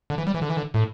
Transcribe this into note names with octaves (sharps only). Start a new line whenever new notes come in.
D3
E3
G3
E3
D3
E3
D3
A2